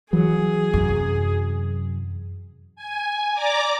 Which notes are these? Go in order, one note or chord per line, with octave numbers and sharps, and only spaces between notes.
E3 F#3 G#4
F#2 C3
G#5
D5 A#5 D6